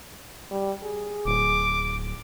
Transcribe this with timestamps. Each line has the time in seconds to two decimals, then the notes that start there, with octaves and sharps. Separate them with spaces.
0.51 G3
0.83 G#4
1.25 D1 D6